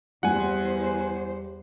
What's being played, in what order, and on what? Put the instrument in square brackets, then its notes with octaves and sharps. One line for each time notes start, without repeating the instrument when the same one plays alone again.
[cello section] E2 C5 [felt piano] G3 [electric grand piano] F#5 G#5